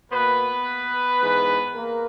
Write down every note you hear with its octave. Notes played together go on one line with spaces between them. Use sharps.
B2 A#3 B3 B4
G#2 E3 G#3
A#3 A#4